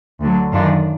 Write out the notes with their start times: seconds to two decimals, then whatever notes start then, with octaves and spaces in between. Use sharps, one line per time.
0.20 D2 D3 F#3
0.52 F#2 D#3 F#3 D4 F4